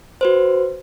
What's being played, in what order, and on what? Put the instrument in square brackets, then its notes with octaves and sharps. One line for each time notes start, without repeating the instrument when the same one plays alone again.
[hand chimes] F#4 B4 C5